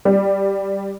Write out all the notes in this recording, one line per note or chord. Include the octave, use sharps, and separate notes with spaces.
G3